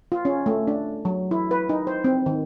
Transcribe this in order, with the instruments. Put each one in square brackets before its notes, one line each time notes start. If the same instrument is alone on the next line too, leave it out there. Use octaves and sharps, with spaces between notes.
[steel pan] F4
C#4
A3
D4
F#3
E4
B4
D#4
C5
C4
D#3